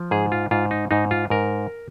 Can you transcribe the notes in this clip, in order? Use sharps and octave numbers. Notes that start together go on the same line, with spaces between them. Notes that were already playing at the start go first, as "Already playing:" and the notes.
Already playing: F3
G#2 G#4
F4
G#2 F4
D#4
G#2 D#4
F4
G#2 A#4